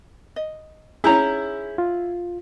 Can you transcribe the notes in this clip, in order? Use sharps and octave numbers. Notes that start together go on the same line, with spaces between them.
D#5
C#4 D#4 E4 G#4 A#5 G6
F4